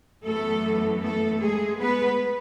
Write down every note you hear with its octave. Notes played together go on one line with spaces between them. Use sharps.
F#2 E3 A3 B3 A4
A3 A4
G#3 G#4
B3 B4